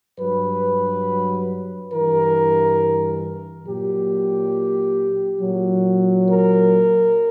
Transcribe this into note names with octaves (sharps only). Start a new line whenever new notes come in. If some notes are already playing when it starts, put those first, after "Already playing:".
G2 F#3 B4
G2 E3 A#4
A#2 F#3 G4
A#2 F#3
A#4